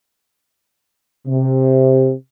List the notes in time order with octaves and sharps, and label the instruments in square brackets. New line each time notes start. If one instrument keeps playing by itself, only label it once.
[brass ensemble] C3